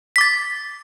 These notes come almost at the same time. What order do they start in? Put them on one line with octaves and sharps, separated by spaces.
B6 D6 A6